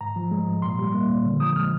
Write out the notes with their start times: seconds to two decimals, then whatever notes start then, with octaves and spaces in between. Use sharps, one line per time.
0.01 G#2 A#5
0.16 F3
0.31 G#3
0.48 G#2
0.62 A#2 C6
0.79 G3
0.94 A#3
1.09 A#2
1.25 D3
1.40 F3 D#6
1.56 G#3 F6